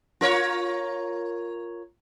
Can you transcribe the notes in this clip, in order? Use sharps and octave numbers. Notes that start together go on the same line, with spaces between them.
F4 A#4 C#5